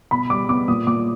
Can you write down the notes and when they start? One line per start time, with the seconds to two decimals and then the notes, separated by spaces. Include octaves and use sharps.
0.11 B2 B5
0.30 G3 D6
0.49 B3 D6
0.68 A#2 D#6
0.87 A#2 D6